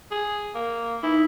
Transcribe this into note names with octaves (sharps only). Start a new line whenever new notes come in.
G#4
A#3
D#4 E4